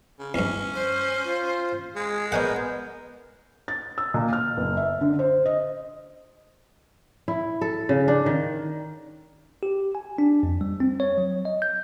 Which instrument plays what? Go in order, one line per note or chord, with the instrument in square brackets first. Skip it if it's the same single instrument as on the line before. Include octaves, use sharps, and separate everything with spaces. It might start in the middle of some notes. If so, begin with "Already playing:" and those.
[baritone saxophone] C#3
[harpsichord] E2 G2 [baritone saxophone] C#4
[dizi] C5
[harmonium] F4
[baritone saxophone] G#3 [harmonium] G#4
[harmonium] B3 A#4 G#5 [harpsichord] C#5 D#5 F#5 [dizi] G6
[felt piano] A6
E6
A#2
F6
F#1
E5
D3
C5
D#5
[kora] E4
A4
C#3
D4
D#3
[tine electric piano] G4
G#5
D4
F2
G3
C4
C#5
F#3
D#5
G6